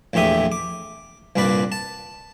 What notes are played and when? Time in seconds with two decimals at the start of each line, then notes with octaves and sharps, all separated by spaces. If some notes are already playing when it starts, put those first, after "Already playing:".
0.13 A#1 E2 A2 G4 E5 D#6
0.52 D6
1.36 C2 G2 A#2 D4 B4 D5
1.72 A5